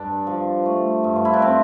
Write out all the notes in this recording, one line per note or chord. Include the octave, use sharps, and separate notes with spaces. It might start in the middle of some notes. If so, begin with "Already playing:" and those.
Already playing: G2 D4
F3
A3
G2
F4
E4
D4
C4